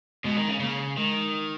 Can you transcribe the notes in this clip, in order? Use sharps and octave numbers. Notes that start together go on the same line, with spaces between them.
B2 G#3
D#3
C#3
C#3 A#3
D#3 G#3